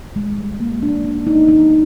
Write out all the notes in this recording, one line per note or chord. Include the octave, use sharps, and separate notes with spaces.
G#3
G3
A#3
D4
D4
D#4
D#4